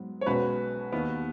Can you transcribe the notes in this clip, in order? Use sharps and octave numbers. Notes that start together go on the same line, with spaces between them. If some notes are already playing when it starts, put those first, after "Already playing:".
Already playing: G#2 F#3 B3
C#5
B1 B2 G#3 C#4 F#4 B4
D#2 D#3 B3